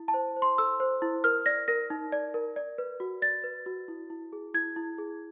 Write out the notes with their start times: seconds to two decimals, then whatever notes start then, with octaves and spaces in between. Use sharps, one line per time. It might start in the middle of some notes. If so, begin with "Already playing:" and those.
Already playing: E4
0.08 A5
0.14 C5
0.36 C5
0.42 C6
0.58 A4 E6
0.80 C5
1.02 E4
1.24 A#4 F6
1.46 D5 A#6
1.68 A#4 A#6
1.90 D#4
2.12 D5
2.34 A#4
2.56 D5
2.78 B4
3.00 F#4
3.22 D5 A6
3.44 B4
3.66 F#4
3.88 E4
4.10 E4
4.33 G#4
4.54 E4 G#6
4.76 E4
4.98 G#4